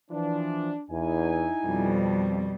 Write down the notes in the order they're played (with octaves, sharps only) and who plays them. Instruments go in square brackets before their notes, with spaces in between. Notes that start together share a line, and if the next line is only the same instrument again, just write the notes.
[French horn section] E3 F3 [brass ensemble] D4
[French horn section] E2 [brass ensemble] D#4 E4 G#5
[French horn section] F2 [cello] B2 G3